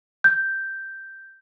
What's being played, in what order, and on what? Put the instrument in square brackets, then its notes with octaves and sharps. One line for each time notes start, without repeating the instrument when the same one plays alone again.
[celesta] G6